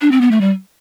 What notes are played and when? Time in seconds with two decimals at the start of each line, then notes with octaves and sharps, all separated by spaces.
0.01 D4
0.11 C4
0.21 B3
0.31 A3
0.41 G3